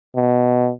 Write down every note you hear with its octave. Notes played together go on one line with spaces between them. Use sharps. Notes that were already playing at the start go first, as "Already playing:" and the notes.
B2